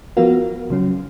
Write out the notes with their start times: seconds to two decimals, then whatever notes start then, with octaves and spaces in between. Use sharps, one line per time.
0.17 F3 B3 F#4 A#4 F5
0.70 C#3 F#3 C#4